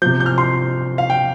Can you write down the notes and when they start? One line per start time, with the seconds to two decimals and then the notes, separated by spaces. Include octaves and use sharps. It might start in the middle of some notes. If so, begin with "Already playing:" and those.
0.02 C3 F3 G6
0.20 G6
0.26 F6
0.38 C6
0.98 F5
1.10 G5